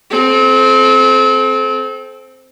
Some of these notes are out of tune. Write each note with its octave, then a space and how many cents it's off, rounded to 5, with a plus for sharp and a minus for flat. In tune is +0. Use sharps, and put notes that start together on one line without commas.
C4 +0 A4 -35